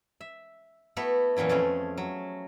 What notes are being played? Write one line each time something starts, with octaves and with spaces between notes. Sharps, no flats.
E5
A3 B3 E4 F#4 A4 B4
F#2 A#2 E3 F#3 E4
F2 A3 C#4 G#4
F#3